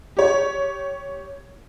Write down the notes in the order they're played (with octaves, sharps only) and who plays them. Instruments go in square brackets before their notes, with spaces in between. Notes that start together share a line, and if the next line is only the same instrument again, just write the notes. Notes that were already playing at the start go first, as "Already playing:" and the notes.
[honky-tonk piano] G4 C#5